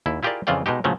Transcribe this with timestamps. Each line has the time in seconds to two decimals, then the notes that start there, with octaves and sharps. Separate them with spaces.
0.06 D#2 E4
0.23 E4 F4 G4 G#4 A#4 D5
0.47 F2 C#3 E3 F4 D5 G5
0.66 B2 G#3 D#4 G4
0.84 A2 C#3 F3 F#3 A3